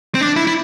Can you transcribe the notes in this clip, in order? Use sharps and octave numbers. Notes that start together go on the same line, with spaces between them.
C4
D4
E4
E4